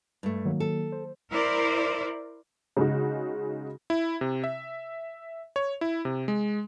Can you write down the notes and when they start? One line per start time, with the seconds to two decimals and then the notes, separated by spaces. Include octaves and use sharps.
0.23 G2 A3
0.45 D#3 F#3 A#3
0.60 A4
0.92 C5
1.32 E4 A#4 C5 D5
2.77 C#3 G#3 D#4 F#4
3.90 E4
4.21 C3
4.44 E5
5.56 C#5
5.81 E4
6.05 C3
6.28 G#3